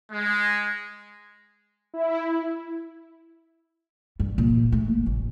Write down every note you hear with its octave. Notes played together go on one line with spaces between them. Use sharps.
G#3
E4
G2
A#2
A3
A#3
A1